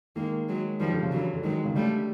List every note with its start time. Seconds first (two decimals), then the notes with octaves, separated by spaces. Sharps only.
0.16 D#3 G#3 A#3
0.49 F#3 G#3
0.80 D#3 F3 G3
0.92 D3
1.03 C#3
1.11 D3 E3 F#3
1.34 D3
1.43 D#3 F#3 G#3
1.65 C#3
1.75 D3 G3 A3